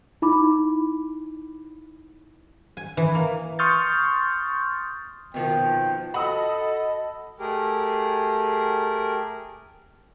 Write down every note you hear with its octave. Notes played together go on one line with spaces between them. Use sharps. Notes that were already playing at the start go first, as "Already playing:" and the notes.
D#4 E4 B5 D6
G#5
E3
A#3
C6 C#6 D#6 F6 G6 A6
F2 B2 D#3 F3 G5
F#4 A4 D#5 B5 D#6 E6
A3 G4 G#4 A#4